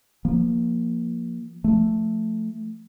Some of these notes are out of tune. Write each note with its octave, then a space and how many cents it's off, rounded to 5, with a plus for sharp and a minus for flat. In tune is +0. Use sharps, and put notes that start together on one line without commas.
F3 +0 A#3 +0
F3 +0 A3 +0